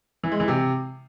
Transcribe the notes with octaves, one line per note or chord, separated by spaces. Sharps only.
E3
G#3
E3
C3